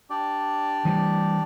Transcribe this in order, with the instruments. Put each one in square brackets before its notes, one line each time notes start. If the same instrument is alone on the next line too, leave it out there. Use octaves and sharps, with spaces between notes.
[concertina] D4 G4 D5
[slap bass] E3 G3